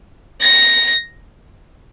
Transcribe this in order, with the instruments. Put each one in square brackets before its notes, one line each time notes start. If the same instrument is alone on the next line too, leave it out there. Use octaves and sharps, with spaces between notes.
[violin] A#6